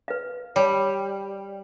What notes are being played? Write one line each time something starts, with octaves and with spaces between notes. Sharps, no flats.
B4 F5
G3 C#5 A5